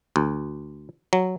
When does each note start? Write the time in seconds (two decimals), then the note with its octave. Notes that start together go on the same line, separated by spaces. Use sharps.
0.16 D2
1.13 F#3